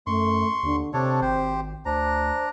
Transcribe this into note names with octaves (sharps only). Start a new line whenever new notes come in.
F#2 A3 C6 C#6
D#2 D3
C3 C4 D4 A4 C#5
G#1 G4 C5
D2 D4 C5 A#5